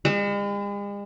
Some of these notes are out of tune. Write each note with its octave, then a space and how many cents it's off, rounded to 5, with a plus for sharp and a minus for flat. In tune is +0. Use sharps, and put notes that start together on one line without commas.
G#3 -45